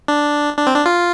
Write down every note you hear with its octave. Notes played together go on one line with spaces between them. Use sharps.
D4
D4
C4
D4
F4